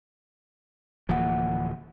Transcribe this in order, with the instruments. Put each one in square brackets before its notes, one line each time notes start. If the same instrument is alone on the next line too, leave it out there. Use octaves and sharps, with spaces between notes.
[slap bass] D1 E3 F3 [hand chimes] A#3 F#5